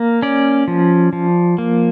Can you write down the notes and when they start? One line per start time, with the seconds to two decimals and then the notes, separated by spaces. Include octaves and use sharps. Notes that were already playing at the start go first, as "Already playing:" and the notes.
Already playing: A#3
0.22 C#4 D5
0.68 F3
1.13 F3
1.58 A#3